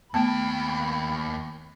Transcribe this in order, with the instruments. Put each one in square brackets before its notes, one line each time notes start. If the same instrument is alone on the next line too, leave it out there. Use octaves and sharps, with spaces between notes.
[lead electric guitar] D#2 G5 [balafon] A3 B3 A5 [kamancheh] B5